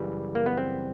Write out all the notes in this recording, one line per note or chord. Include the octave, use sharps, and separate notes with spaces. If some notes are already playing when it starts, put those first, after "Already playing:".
Already playing: F#2 C#3 E3 G3
A#3
B3
C4